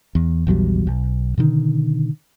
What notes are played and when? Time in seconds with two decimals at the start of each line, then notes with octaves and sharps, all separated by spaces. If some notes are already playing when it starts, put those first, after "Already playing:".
0.15 E2
0.47 A#1 E2 F#3 G3
0.87 B1
1.38 B2 D3 D#3